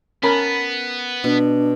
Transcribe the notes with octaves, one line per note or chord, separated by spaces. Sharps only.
B3 C#4 A#4 A5 B5
B2 D4